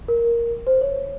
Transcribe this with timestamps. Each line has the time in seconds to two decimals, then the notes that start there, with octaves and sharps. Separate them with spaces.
0.08 A#4
0.67 C5
0.81 C#5